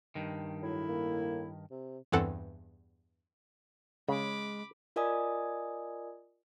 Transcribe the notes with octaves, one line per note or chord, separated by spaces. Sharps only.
G2 D#3
A2 F#3 E4
A#3
C3
E2 G2 E3 C4 A4 F#5
C#3 G#3 B5 D6
F4 A#4 D5 D#5 G#5 D#6